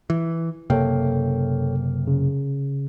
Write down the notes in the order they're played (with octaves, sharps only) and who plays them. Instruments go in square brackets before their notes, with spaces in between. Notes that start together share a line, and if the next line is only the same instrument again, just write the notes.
[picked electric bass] E3
[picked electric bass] F#1 C3 A#3 [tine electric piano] A4 C#5 G5
[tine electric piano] C#3